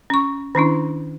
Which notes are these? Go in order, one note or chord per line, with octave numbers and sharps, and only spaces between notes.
C#4 C#6
D#3 C#4 D4 E4